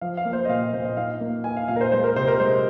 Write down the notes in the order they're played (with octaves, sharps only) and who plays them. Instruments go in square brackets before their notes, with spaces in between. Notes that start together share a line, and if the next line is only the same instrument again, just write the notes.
[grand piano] F3 F5
F5
A#3
C5
D#5
A#2 F5
A#2 C5
D#5
D#4 F5
A#3
D#4 G#5
F5
A#2 F5
A#4
C5
G#3 C5
A#4
C3 C5
A#4
G#3 C5